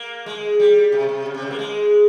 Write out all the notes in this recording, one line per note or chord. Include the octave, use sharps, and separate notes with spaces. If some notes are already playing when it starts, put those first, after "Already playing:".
Already playing: A#3
G#3
G3
C3
C3
C#3
C3
C#3
A#3
G#3